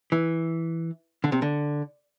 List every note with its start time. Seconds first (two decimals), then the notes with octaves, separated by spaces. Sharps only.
0.12 E3
1.24 D3
1.32 C3
1.42 D3